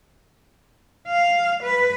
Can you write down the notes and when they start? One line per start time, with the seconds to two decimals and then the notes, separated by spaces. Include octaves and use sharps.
1.08 F5
1.63 B4